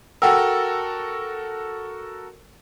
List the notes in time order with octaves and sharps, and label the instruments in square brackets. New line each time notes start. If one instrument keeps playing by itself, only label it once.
[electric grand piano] F#4 A4 A#4 [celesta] F#5 G5 E6